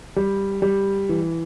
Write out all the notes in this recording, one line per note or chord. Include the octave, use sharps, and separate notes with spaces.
G3
G3
E3